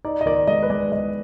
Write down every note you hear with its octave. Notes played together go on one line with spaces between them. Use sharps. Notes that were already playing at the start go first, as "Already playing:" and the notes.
D#4 D5
D#5
D#3 D5
G#3 D#5
B4
G#3 D5
G#3 D#5